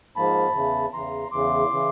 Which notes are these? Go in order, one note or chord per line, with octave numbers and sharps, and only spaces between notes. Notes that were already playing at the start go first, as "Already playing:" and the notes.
G#2 F3 A#3 A5 B5
E2 C#3 E3
E2 C#3 E3 A#5 C6
E2 C#3 E3 C6 D6
C#3 E3